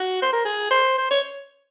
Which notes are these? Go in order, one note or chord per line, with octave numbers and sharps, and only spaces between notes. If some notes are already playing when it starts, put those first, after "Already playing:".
Already playing: F#4
C5
A#4
G#4
C5
C5
C#5